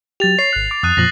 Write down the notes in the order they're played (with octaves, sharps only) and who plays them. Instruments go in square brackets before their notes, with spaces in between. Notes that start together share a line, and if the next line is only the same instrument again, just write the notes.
[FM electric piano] F#3 G4 [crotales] A6 F7
[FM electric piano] C#5 [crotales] C7
[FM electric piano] G#1 F#6
D6
[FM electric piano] F2 [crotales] D#6 F#6 D#7
[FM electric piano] F2 A#2 F3 [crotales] A#6 F#7